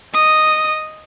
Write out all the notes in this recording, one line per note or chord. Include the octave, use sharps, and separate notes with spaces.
D#5 D#6